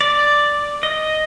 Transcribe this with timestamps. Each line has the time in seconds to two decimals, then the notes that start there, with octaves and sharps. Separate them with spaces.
0.01 D5
0.83 D#5